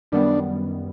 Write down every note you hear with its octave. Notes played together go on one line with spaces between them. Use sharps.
F#2 D#3 G3 B3 D4